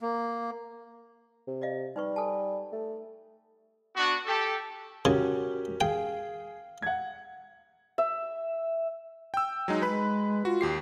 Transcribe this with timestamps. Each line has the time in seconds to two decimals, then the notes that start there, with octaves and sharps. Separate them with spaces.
0.01 A#3
1.48 C3
1.62 D5 D#5 F5
1.96 G3 D#4 B4 C#6
2.16 A4 G#5 A5
2.72 A3
3.96 B3 D4 F#4
4.26 G4 A4
5.05 C#3 C#4 F#4 G4 A#4
5.81 G#4 F5 G5
6.82 F#5 G#6
7.98 E5
9.34 G5 E6
9.68 F#3 G#3 D#4
9.82 G#3 B4 B5
10.45 F4 F#4
10.61 D#2 G4 C7